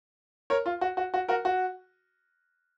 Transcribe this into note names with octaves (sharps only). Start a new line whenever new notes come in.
A#4 C#5
F4
F#4
F#4
F#4
F#4 A#4
F#4